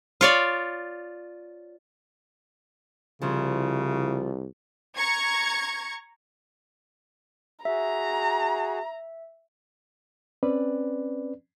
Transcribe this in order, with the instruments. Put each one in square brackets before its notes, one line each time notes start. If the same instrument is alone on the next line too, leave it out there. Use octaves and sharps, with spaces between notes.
[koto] F4 C#5 D5
[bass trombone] C2 [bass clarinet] C#3 [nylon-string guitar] F3 G3 E4
[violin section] A#5 C#6 G#6 C#7
[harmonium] F#4 G#4 [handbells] E5 [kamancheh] A#5
[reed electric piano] C4 C#4 B4 D5